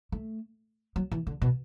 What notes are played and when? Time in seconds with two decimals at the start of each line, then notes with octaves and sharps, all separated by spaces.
0.12 A3
0.96 F#3
1.11 E3
1.27 D3
1.42 B2